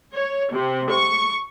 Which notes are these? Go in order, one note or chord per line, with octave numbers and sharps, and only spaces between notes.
C#5
C3
C#6